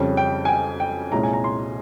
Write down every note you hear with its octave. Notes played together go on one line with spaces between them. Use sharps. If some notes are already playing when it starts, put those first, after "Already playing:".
Already playing: F2 C#3 G3 C#4
G5
G#5
G5
G5
C2 A#2 G#3 C#4 A#5
G#5
A#5
C6